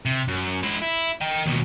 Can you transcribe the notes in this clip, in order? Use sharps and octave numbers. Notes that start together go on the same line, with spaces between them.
C3
F#2
G#3 E4
E4
D#5 G5
D#2 B2